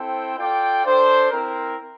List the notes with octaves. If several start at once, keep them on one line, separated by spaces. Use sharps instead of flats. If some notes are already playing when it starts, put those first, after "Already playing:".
Already playing: C4 E4 A4 C5 G5
F4 A4 D5 G5
D4 A4 C5
C4 E4 A#4